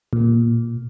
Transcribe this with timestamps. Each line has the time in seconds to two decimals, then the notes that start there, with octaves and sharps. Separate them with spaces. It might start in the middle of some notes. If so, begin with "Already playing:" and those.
0.13 A#2